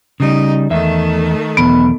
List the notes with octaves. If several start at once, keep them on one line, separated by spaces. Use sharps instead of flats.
C#3 G3 D#4
E2 D#3 A3 E5
B1 E2 B3